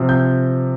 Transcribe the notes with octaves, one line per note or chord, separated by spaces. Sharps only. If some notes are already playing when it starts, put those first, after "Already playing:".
Already playing: C3 F3
G6